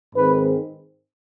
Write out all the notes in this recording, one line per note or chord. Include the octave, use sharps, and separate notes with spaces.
G#2 D#3 G#3 C4 B4